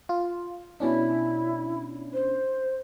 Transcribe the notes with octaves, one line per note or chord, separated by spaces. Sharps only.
F4
B2 C#4 D4 E4
C5